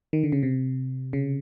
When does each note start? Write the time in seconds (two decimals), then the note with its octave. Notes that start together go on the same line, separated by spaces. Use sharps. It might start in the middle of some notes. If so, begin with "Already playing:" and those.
0.13 D#3
0.23 D3
0.32 C#3
0.43 C3
1.13 C#3